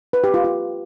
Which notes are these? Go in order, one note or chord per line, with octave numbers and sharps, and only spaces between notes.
B4
G4
F4
F4